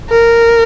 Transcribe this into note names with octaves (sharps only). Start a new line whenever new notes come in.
A#4